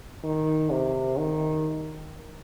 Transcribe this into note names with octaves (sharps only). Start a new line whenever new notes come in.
D#3
C3
D#3